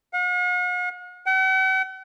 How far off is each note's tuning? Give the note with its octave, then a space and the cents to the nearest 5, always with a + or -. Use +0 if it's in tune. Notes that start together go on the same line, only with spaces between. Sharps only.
F#5 -45
F#5 +45